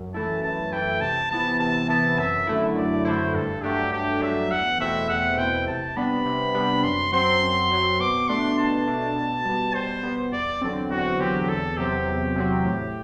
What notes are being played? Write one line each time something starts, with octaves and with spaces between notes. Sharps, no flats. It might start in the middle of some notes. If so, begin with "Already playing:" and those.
Already playing: F#2
E3 A3 E4 A5
F#2 A5
E3 A3 E4 G5
C3 A5
E3 B3 E4 A5
C3 A5
E3 B3 E4 A5
F#2 E5
D3 A3 E4
F#2 D5
D3 A3 E4 C5
G2 A4
F#3 A3 D4 G4
G2 G4
F#3 A3 D4 E5
E2 F#5
B2 A3 C4 E4 E5
E2 F#5
B2 A3 C4 E4 G5
C3 A5
G3 B3 D4 B5
C3
G3 B3 D4
F#2 C6
F#3 C4 C6
F#2
F#3 C4
B2 D6
A3 D4 C6
B2 A5
A3 D4
B2
G3 B3
B2 C5
G3 B3
E2 D5
D3 F#3 C4
E2 F#4
D3 F#3 C4 G4
E2 A4
C3 F#3 C4 G4
E2
C3 F#3 C4
A2